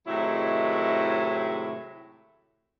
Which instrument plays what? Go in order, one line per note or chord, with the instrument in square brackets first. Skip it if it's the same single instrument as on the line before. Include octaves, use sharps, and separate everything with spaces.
[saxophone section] A2 C3 D#3 F#3 G#3 E4